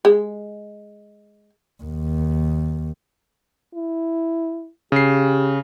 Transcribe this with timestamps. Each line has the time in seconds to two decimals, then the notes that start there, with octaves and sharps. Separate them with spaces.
0.05 G#3
1.83 D#2
3.74 E4
4.92 C#3 G4 C7